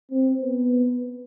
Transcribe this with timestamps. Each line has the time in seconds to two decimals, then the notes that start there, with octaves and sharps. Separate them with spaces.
0.11 C4
0.40 B3